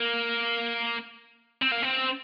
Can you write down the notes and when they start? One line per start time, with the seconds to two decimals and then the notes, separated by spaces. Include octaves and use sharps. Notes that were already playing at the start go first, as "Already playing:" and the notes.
Already playing: A#3
1.62 C4
1.72 A#3
1.83 C4